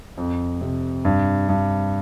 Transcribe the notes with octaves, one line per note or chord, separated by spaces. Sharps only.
F2
C3
G2
G2